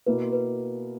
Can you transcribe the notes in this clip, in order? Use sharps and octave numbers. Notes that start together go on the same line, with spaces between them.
B2 A#3 E4 B4
B4